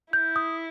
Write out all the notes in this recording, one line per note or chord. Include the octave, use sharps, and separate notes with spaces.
E4 G6
D#6